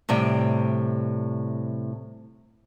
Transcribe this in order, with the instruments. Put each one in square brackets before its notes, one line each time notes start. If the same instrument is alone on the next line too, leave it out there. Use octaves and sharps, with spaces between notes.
[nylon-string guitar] A2 C3 G3 G5